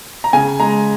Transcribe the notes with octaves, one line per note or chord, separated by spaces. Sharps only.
A#5
C#3 G#5
G#3 A#5